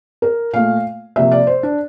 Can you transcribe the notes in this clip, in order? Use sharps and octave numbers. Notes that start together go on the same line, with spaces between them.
A#4
A#2 A3 F5
C3 F3 A#3 E5
D5
C5
D4